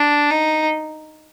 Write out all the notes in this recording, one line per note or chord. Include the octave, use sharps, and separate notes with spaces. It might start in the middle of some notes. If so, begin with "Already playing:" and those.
Already playing: D4
D#4